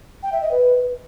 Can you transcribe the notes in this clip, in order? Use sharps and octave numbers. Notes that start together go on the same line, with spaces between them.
G5
E5
D#5
B4